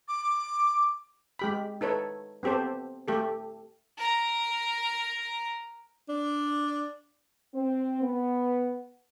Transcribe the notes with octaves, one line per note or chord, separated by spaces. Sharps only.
D6
G#3 G4 B5
D#4 A4 B4 C#5
B3 C4 G4 A4 C5
A3 G4 A4
A#4 A#5
D4
C4
B3